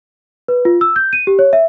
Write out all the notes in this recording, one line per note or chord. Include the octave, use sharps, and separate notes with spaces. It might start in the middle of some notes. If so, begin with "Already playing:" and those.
B4
F4
E6
G6
D#7
G4
C#5
E5